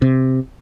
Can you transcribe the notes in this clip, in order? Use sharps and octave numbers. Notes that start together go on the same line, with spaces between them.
C3